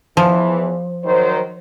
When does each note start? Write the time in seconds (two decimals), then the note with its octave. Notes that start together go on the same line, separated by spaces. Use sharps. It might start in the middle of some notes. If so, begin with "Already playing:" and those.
0.17 E2 E3 F3
1.04 D#3 F#3 C5